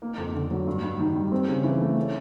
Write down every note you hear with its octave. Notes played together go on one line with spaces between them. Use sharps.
A#3
F2
D3
F#3
G2
G2
D#3
G3
C4
C#3
E3
A3
C#4